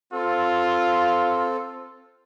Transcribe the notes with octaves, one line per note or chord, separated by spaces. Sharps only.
C4 F4 A4